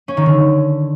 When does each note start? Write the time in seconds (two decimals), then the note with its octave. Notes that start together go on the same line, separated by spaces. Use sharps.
0.08 C#4
0.17 D#3
0.26 D3